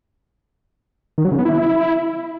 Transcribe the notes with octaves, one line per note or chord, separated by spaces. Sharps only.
D#3
F#3
C#3
B3
E4